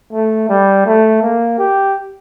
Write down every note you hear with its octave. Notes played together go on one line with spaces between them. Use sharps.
A3
G3
A3
A#3
G4